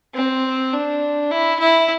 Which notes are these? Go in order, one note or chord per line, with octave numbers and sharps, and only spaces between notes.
C4
D4
E4
E4